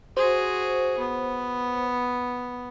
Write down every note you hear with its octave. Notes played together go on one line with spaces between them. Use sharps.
F#4 G#4 C5
B3